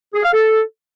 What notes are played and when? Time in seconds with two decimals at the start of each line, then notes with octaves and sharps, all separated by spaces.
0.14 G#4
0.23 F5
0.32 A4